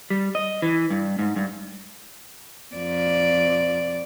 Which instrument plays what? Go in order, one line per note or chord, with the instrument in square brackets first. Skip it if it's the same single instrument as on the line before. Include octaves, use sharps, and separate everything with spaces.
[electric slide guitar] G3
D#5
E3
G2
G#2
G2
[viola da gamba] F2 D5